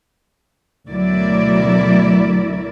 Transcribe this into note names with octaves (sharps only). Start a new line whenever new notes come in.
D2 B2 F#3 E4 A#4 D5